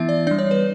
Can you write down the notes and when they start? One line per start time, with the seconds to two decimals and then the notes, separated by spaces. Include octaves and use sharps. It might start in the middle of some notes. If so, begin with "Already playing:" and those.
Already playing: E3 B3 E4 E5
0.09 D5
0.27 G3 D4 D5
0.39 C#5
0.51 B4